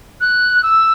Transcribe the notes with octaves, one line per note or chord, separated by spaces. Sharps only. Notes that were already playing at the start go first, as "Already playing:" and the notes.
F#6
E6